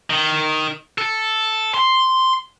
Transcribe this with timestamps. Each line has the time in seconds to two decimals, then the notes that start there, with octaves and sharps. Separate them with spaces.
0.10 D#3
0.98 A4
1.74 C6